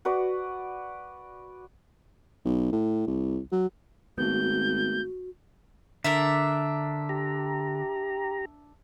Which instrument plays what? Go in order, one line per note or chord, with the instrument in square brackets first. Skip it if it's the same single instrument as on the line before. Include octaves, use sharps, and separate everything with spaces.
[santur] F#4 B4 D5
[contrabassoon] B1
A2
C2
F#3
[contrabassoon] G#1 [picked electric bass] A3 B3 [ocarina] F#4 [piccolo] G6
[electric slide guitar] D3 [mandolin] D4 A#4 E5
[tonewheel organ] G4 A#5